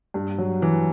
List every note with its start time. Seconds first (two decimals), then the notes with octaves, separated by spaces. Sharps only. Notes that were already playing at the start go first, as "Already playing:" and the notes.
0.14 G2
0.38 F#3
0.62 E3